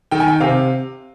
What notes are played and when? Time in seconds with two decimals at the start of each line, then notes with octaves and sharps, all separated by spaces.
0.11 D#3 G5
0.20 G#5
0.28 G5
0.40 C3 F5